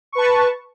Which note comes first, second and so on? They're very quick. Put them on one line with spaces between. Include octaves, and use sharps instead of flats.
C#6 B4 A5